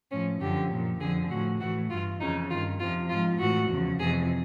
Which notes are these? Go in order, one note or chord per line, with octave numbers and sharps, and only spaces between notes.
A2 F3 C#4
F#2 D3 F3 G4
A#2 F3
F2 D3 F3 G#4
A2 F3 F#4
A2 E3 F#4
G2 E3 F4
F2 C#3 E3 D#4
G2 D#3 F4
F2 C3 F3 F4
G#2 F3 F4
A2 E3 F#4
E2 C#3 F3
F2 C3 E3 G#4